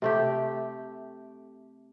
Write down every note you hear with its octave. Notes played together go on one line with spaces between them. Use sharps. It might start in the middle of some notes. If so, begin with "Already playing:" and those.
C3 A3 G4